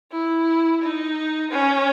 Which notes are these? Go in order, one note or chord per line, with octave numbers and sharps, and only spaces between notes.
E4
D#4
C#4